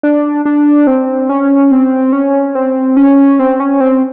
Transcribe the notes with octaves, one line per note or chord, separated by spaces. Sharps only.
D4
D4
C4
C#4
C4
C#4
C4
C#4
C4
C#4
C4